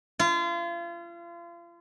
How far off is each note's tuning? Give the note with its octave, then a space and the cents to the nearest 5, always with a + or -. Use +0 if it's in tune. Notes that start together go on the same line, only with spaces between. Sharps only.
F4 -35